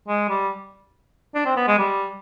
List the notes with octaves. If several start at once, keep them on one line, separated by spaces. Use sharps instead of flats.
G#3
G3
D4
C4
B3
G#3
G3